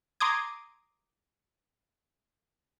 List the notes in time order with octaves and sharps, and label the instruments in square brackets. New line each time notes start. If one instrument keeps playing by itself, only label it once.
[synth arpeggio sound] A#5 C6 D6 D#6 G#6